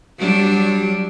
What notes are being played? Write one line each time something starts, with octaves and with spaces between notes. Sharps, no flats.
F#3 G3 D4